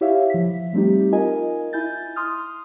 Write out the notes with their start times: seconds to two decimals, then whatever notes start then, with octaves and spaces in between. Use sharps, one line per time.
0.01 E4 G4 C#5 E5 F5
0.30 F3 B6
0.73 G3 A3 C4 D#4 G4
1.12 D#4 F4 A#4 D#5 G#5
1.73 E4 G#5 G6 A6
2.16 C6 D#6 F6